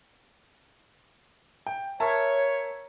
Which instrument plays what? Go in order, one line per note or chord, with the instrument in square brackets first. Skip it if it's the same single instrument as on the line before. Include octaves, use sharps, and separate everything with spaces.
[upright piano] G5
[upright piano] A#4 E5 A5 [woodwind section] C#5